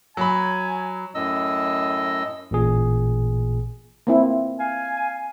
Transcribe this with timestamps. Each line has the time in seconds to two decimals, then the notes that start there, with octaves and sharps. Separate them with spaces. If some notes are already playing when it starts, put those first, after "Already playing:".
0.17 F#3 G#5 B5
1.15 F#2 A2 D#5 E6
2.51 A1 A#2 G#4
4.07 A#3 C4 E4
4.60 F5 G#5